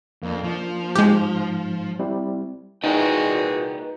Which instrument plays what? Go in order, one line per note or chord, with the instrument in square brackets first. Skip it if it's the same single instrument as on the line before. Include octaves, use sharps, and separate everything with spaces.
[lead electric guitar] F2 [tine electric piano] A#3 D4
[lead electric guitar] F3
[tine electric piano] G#2 [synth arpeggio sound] G#3 G4
[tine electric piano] G3 C4 E4
[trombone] A#2 [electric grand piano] D#4 [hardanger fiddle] F#4 G#4 [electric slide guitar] B4 D#5 G5